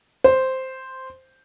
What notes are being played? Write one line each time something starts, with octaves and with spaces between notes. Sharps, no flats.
C5